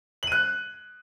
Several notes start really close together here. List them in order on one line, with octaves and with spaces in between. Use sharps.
F#7 D#7 F#6